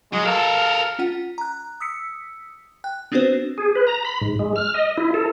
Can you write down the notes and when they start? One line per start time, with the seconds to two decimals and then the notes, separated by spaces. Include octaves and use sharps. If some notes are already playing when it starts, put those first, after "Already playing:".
0.13 F#3 G#3
0.26 A4 A#4 F5
0.99 C#4 F4 F#5
1.38 A#5 F#6
1.80 D#6 E6 B6 C#7
2.84 G5 F#6
3.12 B3 C4 D4 F#4 B4 C5
3.58 G#4
3.75 B4
3.87 A#5
4.05 B5
4.21 G#2
4.39 G#3
4.56 F6
4.74 D#5
4.97 E4
5.14 A4